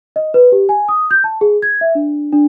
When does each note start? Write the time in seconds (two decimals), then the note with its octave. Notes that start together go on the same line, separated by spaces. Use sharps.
0.16 D#5
0.34 B4
0.52 G4
0.69 G#5
0.88 D#6
1.11 G6
1.24 A5
1.41 G#4
1.62 G#6
1.81 E5
1.95 D4
2.32 D4